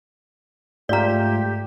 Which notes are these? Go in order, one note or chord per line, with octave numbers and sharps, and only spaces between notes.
G#2 A3 F4 G4 D5 A#5 B6